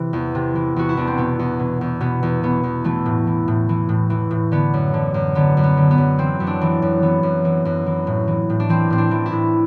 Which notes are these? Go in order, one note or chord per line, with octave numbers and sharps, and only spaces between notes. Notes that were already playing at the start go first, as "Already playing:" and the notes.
Already playing: C3 E3
E2
C3
E3
E2 F#4
E4
E2 D4
C4
B2 B3
E2
B2
E2
B2 B3
E2
B2 B3
E2
E3 A3
A2
E3
A2
E3
A2
E3
A2
D3 B3
F#2
D3
F#2
D3 B3
F#2
B3
D3
B3
F#2
E3 C4
F#2
D4
E3
F#2
E3 B3
F#2
E3
F#2
E3
A2
E3
A2
D4
E3 C4
A2 C4
D4
E3
E4
A2